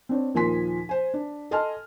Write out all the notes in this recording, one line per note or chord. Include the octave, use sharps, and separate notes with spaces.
C4 D4 C#5
D#2 A#2 F3 G#5 C6 B6
C5 G#5
D4
A4 D#5 G#5 A5 C6 F6